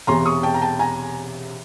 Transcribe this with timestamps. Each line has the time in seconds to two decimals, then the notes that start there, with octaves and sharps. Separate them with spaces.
0.07 E1 E2 C3 A#5 C6
0.25 C#6 D#6
0.43 G5 A5
0.54 A#5
0.62 G5 A5
0.79 G#5 A#5